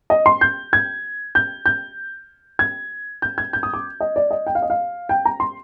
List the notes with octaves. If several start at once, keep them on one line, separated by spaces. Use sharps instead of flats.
D#5
C6
G6
G#6
G6
G6
G#6
G6
G#6
G6
D#6
D6
D#5
D5
D#5
G5
F5
D#5
F5
G5
A#5
C6